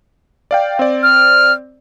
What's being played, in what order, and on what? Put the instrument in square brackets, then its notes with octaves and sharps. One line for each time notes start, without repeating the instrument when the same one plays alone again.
[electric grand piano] D5 F5 G5
C4 D5
[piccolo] F6